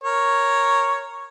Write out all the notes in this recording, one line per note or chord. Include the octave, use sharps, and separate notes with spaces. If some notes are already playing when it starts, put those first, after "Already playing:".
A#4 C#5